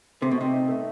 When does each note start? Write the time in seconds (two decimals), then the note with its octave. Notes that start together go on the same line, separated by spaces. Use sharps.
0.21 C3 A3
0.31 B2
0.38 C3 D#4
0.53 D#4
0.69 A3